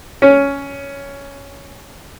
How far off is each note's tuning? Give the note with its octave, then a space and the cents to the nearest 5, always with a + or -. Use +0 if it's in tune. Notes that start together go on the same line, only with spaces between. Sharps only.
C#4 +10